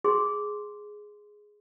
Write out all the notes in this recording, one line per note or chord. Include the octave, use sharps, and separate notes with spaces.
G#4 C6